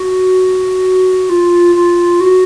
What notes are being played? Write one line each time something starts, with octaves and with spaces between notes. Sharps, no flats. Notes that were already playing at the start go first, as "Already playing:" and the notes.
Already playing: F#4
F4
F4
F#4